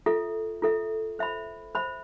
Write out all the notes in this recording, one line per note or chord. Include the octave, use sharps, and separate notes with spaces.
F4 A4 E5
F4 A4 E5
C5 E5 B5
C5 E5 B5